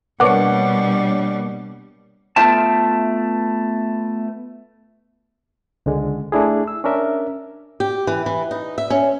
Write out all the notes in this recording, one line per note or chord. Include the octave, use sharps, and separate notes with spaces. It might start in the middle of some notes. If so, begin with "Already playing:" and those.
B2 G3 A#3 D4 B4 C#5 F#5 D6
A3 B3 F4 E5 G5 A5
C#2 D3 G#3
A3 D4 E4 G#4
E6
C#4 D4 A#4 E5
G4
E3
E3
D#4
E5
C#4